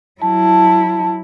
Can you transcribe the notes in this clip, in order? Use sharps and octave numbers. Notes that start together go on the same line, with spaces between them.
F#3 E4 A5